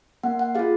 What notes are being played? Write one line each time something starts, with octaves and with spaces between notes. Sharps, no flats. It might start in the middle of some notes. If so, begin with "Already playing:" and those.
A#3 F#5
F#5
F4 G#4 F5